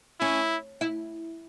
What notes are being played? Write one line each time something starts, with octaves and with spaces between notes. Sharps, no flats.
C#4 E4
E4